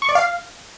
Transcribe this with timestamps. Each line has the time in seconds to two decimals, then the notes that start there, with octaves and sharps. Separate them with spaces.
0.02 C#6
0.09 D5
0.15 F5